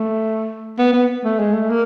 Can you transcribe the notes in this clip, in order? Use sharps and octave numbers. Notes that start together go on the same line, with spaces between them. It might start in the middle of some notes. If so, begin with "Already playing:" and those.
Already playing: A3
B3
B3
A3
G#3
A3
A#3